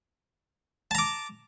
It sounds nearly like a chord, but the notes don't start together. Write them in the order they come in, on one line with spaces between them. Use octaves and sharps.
A5 A#5 D6